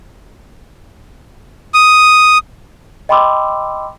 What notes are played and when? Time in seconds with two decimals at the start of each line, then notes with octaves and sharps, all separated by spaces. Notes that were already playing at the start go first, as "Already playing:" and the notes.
1.74 D#6
3.09 D#5 G5 B5 C6 D6 E6